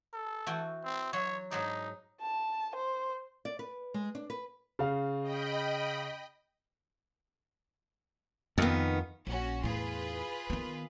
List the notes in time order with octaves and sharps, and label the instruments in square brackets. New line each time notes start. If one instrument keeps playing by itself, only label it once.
[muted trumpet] A4
[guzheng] E3 F#4 G5
[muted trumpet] C4
[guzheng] F#3 [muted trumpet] C#5
[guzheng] G#2 F#3 D5 [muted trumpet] D#4
[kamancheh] A5
C5
[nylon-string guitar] D5
B4
G#3
D4
B4
[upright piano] C#3 F5
[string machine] D#5 G5 B5
[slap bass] F2 [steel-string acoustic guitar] D#3 B3
[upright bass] A#1 [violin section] C#4 F#4
[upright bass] E2 A2 [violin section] F4 G#4 B4
[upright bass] D#3 B3